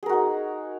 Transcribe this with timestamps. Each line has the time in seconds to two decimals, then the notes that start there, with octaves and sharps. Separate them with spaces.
0.03 G#4
0.06 A#4
0.09 F#4
0.13 D#4